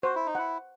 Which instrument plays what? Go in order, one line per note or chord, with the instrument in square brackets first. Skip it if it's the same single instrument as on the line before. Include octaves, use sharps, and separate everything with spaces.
[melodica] F#4 [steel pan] C5
[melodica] E4
D#4
[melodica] E4 [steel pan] F#5